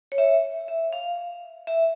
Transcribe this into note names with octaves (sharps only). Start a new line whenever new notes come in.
C#5
E5
E5
F5
E5